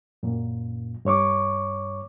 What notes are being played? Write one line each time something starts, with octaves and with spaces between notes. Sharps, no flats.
F#2 A#2
G2 C#5 C#6 D6